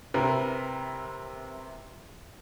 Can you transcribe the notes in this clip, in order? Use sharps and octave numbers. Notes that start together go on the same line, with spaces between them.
C3 E4 A#4 B4